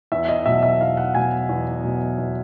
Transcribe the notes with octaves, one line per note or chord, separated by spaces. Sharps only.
E2 E5
D#5
B2 F#3 E5
E5
E2 F5
F#5
B2 F#3 G#5
E2
B2 F#3
E2